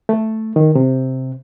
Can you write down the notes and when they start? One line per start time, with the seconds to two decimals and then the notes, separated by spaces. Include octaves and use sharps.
0.09 A3
0.56 D#3
0.75 C3